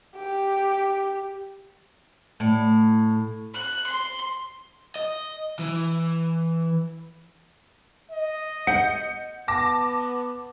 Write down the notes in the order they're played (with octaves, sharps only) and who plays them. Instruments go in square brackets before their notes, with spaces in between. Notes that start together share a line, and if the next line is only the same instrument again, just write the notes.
[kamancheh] G4
[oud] A2
[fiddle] F#6
C6
[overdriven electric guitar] D#5
E3
[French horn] D#5
[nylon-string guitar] F#5 [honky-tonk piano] G6 C#7
[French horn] B3 [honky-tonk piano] A5 D6 A#6